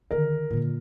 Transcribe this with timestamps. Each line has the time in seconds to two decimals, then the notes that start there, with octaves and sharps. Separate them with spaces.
0.11 D3 D#3 A#4
0.50 A#2 D3